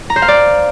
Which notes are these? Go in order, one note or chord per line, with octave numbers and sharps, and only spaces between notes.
A#5
C5
F5
D5